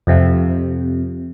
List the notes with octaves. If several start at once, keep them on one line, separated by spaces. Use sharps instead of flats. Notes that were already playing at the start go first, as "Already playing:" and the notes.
F2 C3 F3